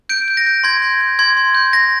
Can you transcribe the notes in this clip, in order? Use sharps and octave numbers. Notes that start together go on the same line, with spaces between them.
G6 D7
G6
A#6
G6
C6 G#6
G6
G6
C6 G#6
C6
G6
G6 A#6